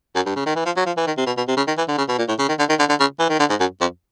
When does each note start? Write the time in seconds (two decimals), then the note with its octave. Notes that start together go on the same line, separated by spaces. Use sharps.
0.15 F#2
0.26 G2
0.36 C#3
0.46 D#3
0.56 E3
0.66 F3
0.77 F#3
0.86 F3
0.97 E3
1.07 D#3
1.17 C3
1.26 B2
1.37 B2
1.48 C3
1.57 C#3
1.68 D#3
1.78 E3
1.88 D3
1.98 C#3
2.09 B2
2.18 A#2
2.28 A2
2.39 C#3
2.49 D#3
2.59 D3
2.69 D#3
2.79 D3
2.89 D3
3.00 C#3
3.19 E3
3.29 D#3
3.40 D3
3.50 G#2
3.60 F#2
3.81 F2